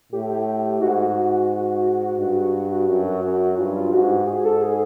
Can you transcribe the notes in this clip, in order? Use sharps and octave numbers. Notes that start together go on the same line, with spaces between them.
A2 G4
G#2 F#4
G2
F#2
F#2
G2 F4
F4
G#2 F#4
G4
G#2 G#4
A4
G#4